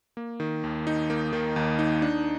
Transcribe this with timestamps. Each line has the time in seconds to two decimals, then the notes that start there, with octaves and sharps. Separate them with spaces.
0.17 A#3
0.40 D#3
0.64 D#2
0.87 D#4
1.10 A#3
1.33 D#3
1.56 D#2
1.79 D#4
2.02 D4